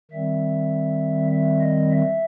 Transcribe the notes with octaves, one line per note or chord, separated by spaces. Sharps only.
D#3 G3 C4 E5
E5
D#5
E5